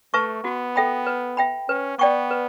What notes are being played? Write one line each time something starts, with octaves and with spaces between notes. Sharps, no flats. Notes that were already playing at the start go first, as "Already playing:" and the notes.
A3 B4 E5 A5 C#6
B3 F#4
A4 E5 G5 B5
B4
E5 G5 B5
C#4 B4
B3 D5 G5 C#6
B4